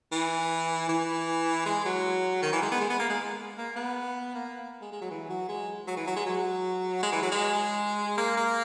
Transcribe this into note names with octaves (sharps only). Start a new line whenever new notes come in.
E3
E3
G#3
F#3
D#3
E3
G#3
B3
G#3
B3
A#3
G#3
A#3
B3
A#3
G#3
G#3
F#3
E3
F#3
G#3
F#3
E3
F#3
G#3
F#3
G#3
E3
F#3
G#3
A#3
A#3